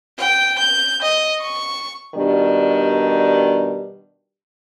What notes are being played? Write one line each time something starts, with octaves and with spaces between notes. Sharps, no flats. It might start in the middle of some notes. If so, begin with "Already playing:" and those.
G5
G6
D#5
C#6
B2 D#3 G3 D4